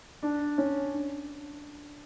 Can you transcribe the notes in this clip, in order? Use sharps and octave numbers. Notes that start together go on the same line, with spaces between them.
D4
C#4
D4